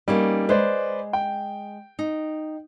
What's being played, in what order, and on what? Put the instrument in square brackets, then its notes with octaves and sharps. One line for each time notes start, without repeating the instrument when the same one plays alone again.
[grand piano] G3 A#3 [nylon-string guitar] B3 C#4 D#4
[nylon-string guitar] G#3 [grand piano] B4 C5 D5
[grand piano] G5
[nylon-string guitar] D#4